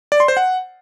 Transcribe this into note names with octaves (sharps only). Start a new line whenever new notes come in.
D5
C6
C5
F#5